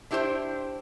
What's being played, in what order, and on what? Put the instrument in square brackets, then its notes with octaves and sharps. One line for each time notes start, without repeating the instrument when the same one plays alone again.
[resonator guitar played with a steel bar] D4 E4 G4 A4 C5